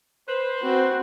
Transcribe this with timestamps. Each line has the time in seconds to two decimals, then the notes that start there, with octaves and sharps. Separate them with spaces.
0.28 B4 C5
0.62 C4 F#4